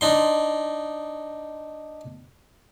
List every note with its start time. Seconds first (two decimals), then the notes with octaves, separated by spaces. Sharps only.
0.01 D4 D#4 C6